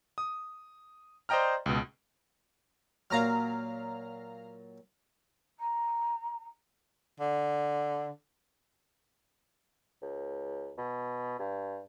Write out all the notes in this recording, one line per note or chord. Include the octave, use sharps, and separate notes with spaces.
D#6
C5 D5 D#5 G5 A#5 F6
C#2 B2
A#2 F#3 F5 A#5 F6
A#5
D3
C#2
B2
G2